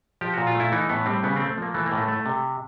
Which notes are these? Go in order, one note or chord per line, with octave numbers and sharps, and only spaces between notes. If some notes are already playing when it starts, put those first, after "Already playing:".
F3 G4
A#2 F#4
F4
A3 E4
E3 D#4
A2 B3
G3 C4
C#3 B3
A3 C4
F3 A#3
E3 A3
A#3
A2
A3
A3
C3